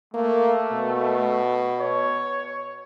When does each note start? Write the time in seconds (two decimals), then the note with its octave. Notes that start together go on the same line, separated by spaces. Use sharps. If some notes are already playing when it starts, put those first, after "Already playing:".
0.14 A3 A#3
0.72 B2
1.80 C#5